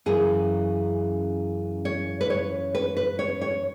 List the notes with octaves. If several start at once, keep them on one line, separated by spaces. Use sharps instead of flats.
F#2 C#3 E3 G#4
C#5
B4
C#5
B4
B4
C#5
C#5